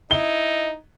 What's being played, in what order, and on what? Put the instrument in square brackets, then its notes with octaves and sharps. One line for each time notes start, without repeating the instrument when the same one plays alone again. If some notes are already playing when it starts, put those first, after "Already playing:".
[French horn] D#4 [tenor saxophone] E4 [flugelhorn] D#5 [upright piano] G7